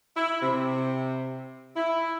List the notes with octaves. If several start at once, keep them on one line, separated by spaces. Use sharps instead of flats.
E4
C3
E4